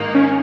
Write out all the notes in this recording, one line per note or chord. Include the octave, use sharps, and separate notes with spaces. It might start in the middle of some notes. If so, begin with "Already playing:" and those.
Already playing: G#2 D#3 A#3 D#4
C#4